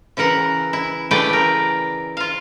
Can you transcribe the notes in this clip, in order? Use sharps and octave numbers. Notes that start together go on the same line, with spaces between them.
C#3 E3 A#4 F#5
E4
C#3 E3 A3 B4 D5 G5
A#4
F4 F5